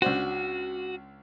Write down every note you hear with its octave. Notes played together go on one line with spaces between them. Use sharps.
C#2 D4 F#4 C5